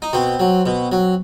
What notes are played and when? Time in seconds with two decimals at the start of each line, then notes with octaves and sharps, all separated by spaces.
0.02 D#4
0.13 B2 C4
0.39 F#3
0.66 B2
0.92 F#3